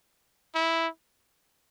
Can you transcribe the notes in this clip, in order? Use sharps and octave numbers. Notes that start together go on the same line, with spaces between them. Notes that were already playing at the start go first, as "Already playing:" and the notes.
E4